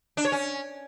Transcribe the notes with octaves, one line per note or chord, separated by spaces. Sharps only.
D4
C#5
C#4